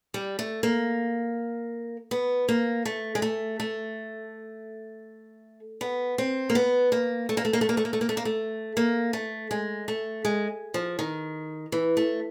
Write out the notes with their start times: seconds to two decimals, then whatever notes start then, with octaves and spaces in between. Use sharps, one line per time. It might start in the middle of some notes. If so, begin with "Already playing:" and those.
0.14 G3
0.39 A3
0.63 A#3
2.11 B3
2.49 A#3
2.85 A3
3.15 G#3
3.22 A3
3.60 A3
5.81 B3
6.18 C4
6.50 A#3
6.55 B3
6.92 A#3
7.29 A3
7.37 A#3
7.45 A3
7.53 A#3
7.61 A3
7.69 A#3
7.77 A3
7.85 A#3
7.93 A3
8.01 A#3
8.09 A3
8.17 A#3
8.25 A3
8.77 A#3
9.13 A3
9.51 G#3
9.88 A3
10.25 G#3
10.74 F3
10.99 D#3
11.72 E3
11.97 A3